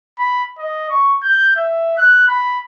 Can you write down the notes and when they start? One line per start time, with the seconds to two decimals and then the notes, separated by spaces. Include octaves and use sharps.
0.19 B5
0.58 D#5
0.89 C#6
1.23 G6
1.56 E5
1.97 F#6
2.28 B5